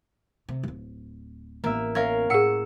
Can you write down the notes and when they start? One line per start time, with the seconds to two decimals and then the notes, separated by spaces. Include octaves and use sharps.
0.49 C3
0.63 D1 G1
1.64 A1 A#3 B3 E5
1.95 C#4 A#4 E5 F5 G#6
2.30 A2 G#4 F#5 E6 C#7